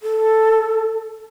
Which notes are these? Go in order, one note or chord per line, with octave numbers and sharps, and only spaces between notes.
A4